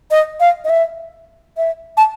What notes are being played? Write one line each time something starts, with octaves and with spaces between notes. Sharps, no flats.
D#5
F5
D#5
E5
E5
A5